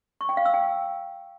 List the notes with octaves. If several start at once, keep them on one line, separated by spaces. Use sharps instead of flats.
C#6
G5
F5
E6
G5